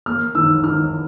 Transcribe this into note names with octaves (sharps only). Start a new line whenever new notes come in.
A#3 F6
D#3 E6
D#3 F6